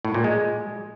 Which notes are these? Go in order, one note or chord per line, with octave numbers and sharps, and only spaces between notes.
A2
A#2
G#3